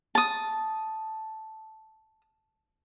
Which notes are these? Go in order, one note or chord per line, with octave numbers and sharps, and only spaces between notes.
A5 D#6